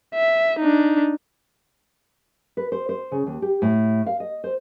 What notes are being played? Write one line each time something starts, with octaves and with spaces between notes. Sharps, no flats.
E5
D4 D#4
B4
C5
C5
C#3
D#2
G4
A2
F5
D#5
C5